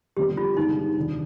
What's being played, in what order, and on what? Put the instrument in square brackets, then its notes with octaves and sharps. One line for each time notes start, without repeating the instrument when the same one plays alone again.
[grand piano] F1 F2 D3 G3 B3 [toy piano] G4
[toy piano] F4
[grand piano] G2 D3 G#3 B3 D4 [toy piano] D#4
[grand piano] F1 D#2 D3